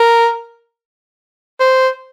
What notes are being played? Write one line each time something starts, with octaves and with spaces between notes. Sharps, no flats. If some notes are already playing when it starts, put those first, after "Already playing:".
Already playing: A#4
C5